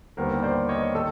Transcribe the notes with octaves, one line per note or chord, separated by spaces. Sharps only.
D#2 D3 G3 B3 A#4 C5
C5 D5
C#5 D#5
D#3 A4